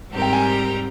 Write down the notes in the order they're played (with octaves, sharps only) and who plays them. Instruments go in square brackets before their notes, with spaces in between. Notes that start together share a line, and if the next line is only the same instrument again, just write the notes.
[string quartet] G#2 G3 C4 G4 A#4
[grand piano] G5
G#5